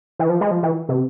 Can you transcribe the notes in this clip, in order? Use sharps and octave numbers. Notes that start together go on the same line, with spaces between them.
E3
F3
G#3
F3
E3
C3